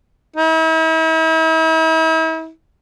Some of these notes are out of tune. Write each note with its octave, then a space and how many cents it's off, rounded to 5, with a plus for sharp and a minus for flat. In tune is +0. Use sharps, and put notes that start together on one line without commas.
E4 -45